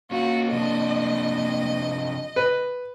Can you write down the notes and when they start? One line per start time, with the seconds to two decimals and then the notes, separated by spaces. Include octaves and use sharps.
0.11 A#3 C#4 F4 F#4
0.52 C3 F3 D4 D#5
2.36 B4